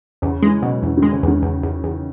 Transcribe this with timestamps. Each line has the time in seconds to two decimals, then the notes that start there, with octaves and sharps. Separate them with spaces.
0.22 E2 C#3
0.42 E3 G#3
0.62 B2 F#3
0.82 E2 E3
0.97 D#3
1.02 G#3
1.12 C#3
1.23 E2 D#3
1.43 E2
1.63 E2
1.84 E2